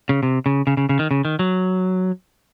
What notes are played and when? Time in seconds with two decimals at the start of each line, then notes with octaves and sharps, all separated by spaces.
0.09 C#3
0.23 C3
0.46 C#3
0.67 C#3
0.77 C#3
0.89 C#3
0.99 D#3
1.11 C#3
1.25 D#3
1.39 F#3